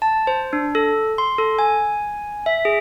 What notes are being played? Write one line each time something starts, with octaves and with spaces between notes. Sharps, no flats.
A5
C5
D4
A4
C6
A4
G#5
E5
G#4